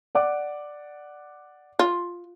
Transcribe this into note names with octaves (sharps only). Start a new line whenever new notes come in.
D5 F#5 D6
F4